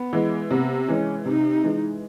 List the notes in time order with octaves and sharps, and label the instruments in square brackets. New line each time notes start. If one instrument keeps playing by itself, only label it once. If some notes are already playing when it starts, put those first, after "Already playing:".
Already playing: [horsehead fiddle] B3
[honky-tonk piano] E3 G#3
[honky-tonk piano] C3 [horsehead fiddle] B3
[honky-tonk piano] E3 G#3 [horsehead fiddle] C#4
[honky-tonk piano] C3 [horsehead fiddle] D#4
[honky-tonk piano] E3 G#3